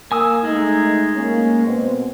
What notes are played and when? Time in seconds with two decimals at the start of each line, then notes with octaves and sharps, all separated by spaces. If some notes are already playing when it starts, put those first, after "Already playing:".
0.12 A#3 G#5 D#6 E6
0.45 G#3 A3 D#4
1.16 A#3 C#4
1.66 B2 C4